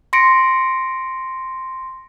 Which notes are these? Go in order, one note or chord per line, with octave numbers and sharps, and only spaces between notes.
C6 A#6 C#7 D7